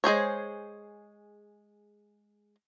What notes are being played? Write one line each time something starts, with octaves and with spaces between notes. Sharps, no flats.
G#3 G#4 C5 C#5